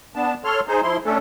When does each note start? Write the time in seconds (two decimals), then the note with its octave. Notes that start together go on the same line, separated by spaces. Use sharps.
0.16 B3 D4 A5
0.44 A4 C#5 C6 F6
0.68 D#4 G#4 C5
0.83 F3 E4 C6
1.05 A3 C#4 D4 A4